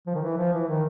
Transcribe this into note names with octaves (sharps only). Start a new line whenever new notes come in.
F3
D#3
E3
F3
E3
D#3